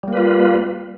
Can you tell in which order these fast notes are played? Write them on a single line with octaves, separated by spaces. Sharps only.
G3 A#3 B4 F4